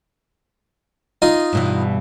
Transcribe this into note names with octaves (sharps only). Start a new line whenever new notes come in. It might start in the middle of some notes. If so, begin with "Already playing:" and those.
D#4 F4 D#5
G2 B2 E3